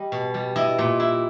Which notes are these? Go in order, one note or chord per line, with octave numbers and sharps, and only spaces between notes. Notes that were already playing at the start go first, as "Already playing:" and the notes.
Already playing: G3 D#5
B2
G3
E4 D#5
A#2
E4